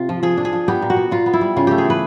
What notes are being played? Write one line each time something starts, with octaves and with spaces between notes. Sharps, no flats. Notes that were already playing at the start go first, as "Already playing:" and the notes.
Already playing: C3 F4
F3
F3 G#4
D4
G#4
F3
B3 G4
A#2
F#4
B3
A#2 F4
B3
E4
G3
C#3 F4
A3 G4
G#4
E3 B4